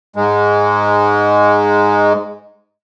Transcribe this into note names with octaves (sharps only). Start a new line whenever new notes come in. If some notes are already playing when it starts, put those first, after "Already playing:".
G#2 G#3